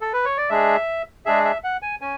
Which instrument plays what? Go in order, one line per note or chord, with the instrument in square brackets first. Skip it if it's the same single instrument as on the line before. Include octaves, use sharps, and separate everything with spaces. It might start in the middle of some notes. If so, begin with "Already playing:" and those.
[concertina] A4
B4
C#5
D5
G#3 D4 G#4 E5
G#3 D4 G#4 E5
E5
F#5
G#5
C#4 G#5